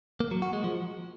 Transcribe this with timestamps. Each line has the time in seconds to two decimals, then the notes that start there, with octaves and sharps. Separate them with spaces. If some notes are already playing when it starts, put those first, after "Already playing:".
0.20 A#3
0.31 F#3
0.42 F#4
0.53 G#3
0.64 F3